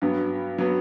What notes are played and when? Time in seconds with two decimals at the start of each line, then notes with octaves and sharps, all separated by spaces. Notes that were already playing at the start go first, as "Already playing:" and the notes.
0.02 G2 F#3 B3
0.58 F#3 B3